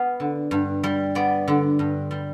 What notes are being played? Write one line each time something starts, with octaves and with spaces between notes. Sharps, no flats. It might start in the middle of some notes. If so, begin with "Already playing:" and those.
Already playing: B3 F5
D3
G2
G3
B3 D5
D3
G2
G3